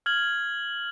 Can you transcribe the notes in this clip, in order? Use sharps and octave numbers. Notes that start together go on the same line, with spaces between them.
F6 G#6 F#7